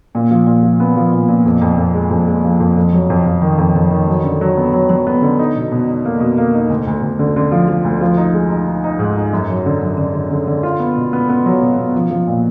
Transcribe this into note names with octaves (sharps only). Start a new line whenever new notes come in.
A#2
F3
A#2
F3
B3
F3
A#2
A#2
F2
F2
F2
G#3
F2
G#3
F3
F2
F2
F#3
F2
F2
D#3
F2
F2
D#3
F#3
D3
F#3
B3
F#3
F#3
B3
D3
D#4
B2
B2
D#4
A#3
B2
A#3
D#4
D2
D2
D2
D3
D3
F3
F3
D2
F3
D#4
G#3
D#4
D#4
D#4
G#2
D#4
F#2
F#3
D3
F#2
D3
D3
D3
D3
F4
B3
B2
B3
B3
F#3
B2
B2
F3
F3
A#2